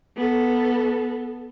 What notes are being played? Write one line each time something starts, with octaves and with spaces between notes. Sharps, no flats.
B3 A4